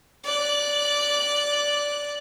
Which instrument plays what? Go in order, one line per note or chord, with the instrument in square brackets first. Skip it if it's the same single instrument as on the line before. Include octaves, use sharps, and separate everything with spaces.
[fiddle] D5 F#6